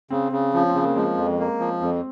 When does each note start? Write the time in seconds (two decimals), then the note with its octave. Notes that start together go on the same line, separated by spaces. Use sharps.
0.10 C#3 C4
0.32 C#3
0.54 F3 C#4
0.70 C4
0.75 C#3
0.83 A#3
0.96 F3 G#3
1.17 F2
1.39 A#3
1.60 F3
1.81 F2 C4